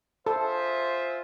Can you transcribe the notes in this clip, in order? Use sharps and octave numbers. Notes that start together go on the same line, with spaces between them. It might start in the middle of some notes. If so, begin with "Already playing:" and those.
F4 G#4 A4 C5 E5